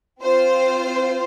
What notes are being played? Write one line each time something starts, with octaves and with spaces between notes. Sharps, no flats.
C4 F4 C5